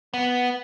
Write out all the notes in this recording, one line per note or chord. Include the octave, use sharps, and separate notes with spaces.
B3